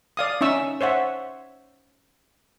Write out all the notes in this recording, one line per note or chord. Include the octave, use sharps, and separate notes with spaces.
D5 F5 D#6
C#4 D#4 E5 C#6 E6
C5 C#5 E5 F#5